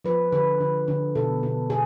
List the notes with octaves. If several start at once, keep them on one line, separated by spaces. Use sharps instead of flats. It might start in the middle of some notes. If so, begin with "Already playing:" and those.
F3 B4
D3 B4
D3
D3
B2 A4
B2
B2 G#4